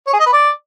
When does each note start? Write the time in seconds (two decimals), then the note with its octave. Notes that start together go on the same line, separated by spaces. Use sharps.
0.07 C#5
0.13 G#4
0.20 D#5
0.26 B4
0.33 D5